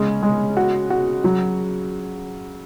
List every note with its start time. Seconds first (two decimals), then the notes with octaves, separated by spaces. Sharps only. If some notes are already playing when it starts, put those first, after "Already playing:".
Already playing: C#3 G#3 C#4
0.23 G#3
0.57 F#4
0.90 F#4
1.24 F#3